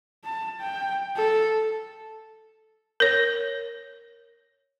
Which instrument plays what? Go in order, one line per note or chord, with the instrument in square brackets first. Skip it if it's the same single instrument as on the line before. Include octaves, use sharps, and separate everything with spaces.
[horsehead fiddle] A5
G5
A4
[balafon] A#4 C#5